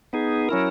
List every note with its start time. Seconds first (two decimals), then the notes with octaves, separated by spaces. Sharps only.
0.13 B3 D#4 G#4
0.49 F#3 C#4 E4 A#4